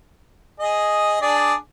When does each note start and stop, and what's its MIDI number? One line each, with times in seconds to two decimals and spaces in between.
0.60 1.19 68
0.60 1.19 75
1.22 1.54 62
1.22 1.54 68
1.22 1.54 74